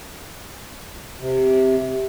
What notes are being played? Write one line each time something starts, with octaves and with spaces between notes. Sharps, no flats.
C3